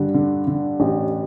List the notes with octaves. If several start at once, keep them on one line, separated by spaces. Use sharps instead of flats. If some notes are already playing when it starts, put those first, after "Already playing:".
Already playing: G2 D3
D3
D3
A1